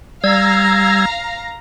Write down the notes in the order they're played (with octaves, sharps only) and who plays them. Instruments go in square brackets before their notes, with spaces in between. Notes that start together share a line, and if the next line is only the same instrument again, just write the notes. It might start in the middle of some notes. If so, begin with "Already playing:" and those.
[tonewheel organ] G3 E6 G#6 [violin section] F5 A#5 A#6